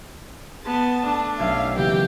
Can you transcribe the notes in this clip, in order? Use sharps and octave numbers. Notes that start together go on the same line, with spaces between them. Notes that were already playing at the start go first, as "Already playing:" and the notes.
B3 A5
A3 D4
B1 C#4 E5 F5
C#3 E3 A#3 G4